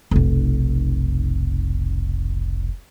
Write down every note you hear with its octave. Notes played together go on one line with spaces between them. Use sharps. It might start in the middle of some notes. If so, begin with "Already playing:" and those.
F1 B1